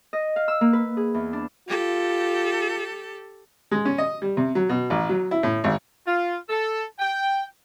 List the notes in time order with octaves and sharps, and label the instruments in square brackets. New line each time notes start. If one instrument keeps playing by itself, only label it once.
[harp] D#5
F5
E6
A#3
B4
G#4
E2
D4
[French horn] F4 [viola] G4 A4
[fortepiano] G#3
C#4
D#5
G3
C3
F#3
B2
A1
F#3
E4
A2
G#1
[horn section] F4
A4
G5